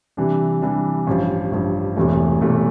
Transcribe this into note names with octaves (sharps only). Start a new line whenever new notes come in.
C3 E3 G3 D4
C3 E3 G3 D4
A1 G2 F3
A1 G2 F3
E1 E2 C3 E3 A3
E1 E2 C3 E3 A3